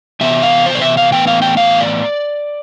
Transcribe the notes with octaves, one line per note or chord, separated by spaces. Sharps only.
C3 E3 B3 E5
F5
C5
D5
E5
F5
A2 E3 B3 G5
F5
G5
F5
D5